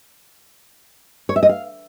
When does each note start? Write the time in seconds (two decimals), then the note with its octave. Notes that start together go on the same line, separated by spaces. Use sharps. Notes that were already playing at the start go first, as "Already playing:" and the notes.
1.29 C#5
1.36 E5
1.43 D#5
1.49 F5